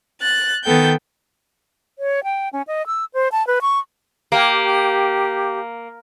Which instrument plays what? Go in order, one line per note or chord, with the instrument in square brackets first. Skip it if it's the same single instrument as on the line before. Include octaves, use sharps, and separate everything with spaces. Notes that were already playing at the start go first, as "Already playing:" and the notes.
[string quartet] F#6 A6
D#3 B3 A4 G5 G6
[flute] C#5
G5
C#4
D#5
E6
C5
A5
B4
C#6
[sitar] A#3 [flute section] G4